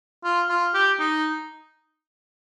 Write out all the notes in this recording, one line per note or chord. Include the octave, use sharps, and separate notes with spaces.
F4
F4
G4
D#4